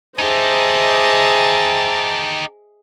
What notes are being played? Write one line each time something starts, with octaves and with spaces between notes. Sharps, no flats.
D#4 G4 G#4 C5 D#5 E5 A5